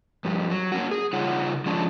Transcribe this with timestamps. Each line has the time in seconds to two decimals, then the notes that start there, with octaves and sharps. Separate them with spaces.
0.24 G2 F3 G4
0.50 F#3
0.72 A#3 C#4 F#4
0.91 G#4
1.13 C#3 G3 D#4 F4 C#5 F#5
1.66 F3 G#3 C#4 D4 A5